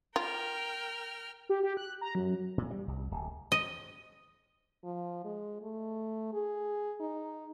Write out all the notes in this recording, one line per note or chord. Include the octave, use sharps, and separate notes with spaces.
F4 A#4 G5 F6
G4
G4
F#6
A#5
F#2
A#2
G3
C2
D1
D#5
F3
G#3
A3
G#4
D#4